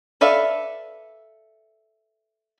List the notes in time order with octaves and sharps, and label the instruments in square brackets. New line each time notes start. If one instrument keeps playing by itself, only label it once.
[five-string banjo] A4 B4 D5 E5 F5